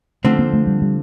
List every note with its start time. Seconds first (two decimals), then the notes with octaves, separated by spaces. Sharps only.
0.24 D3 F3 A3 C4
0.39 A#3
0.53 A3
0.67 G3
0.82 G3